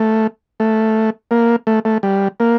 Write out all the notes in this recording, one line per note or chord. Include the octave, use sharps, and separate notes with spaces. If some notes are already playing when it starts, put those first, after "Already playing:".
Already playing: A3
A3
A#3
A3
A3
G3
A#3